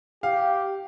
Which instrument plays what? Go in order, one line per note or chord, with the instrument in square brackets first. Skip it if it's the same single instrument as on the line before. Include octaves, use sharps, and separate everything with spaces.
[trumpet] G4 [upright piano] F5